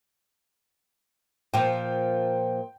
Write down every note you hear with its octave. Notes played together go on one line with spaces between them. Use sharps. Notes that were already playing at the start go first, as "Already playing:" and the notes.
A#2 F3 G5